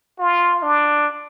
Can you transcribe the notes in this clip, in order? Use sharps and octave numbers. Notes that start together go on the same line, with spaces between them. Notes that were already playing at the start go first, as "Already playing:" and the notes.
F4
D4